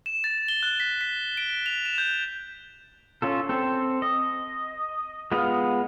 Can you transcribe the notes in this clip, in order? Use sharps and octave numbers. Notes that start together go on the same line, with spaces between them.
E7
A6
G7
F#6
B6
B6
D7
F7
E7
G6
C#4 F4 A4
C4 A4
D#5
G#3 B3 F4 D#5 F5